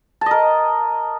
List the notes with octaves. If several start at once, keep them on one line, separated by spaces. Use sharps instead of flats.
A#4 D#5 A5